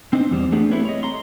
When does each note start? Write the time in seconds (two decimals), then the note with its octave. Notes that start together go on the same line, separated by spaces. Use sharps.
0.13 C4 D4 D#4 C5
0.31 E2 G3 C5
0.52 A3 B3 D4 G4 G#4
0.71 C4 E4 A4 B4 C#5
0.85 C#5 D#5
1.03 A#5 C6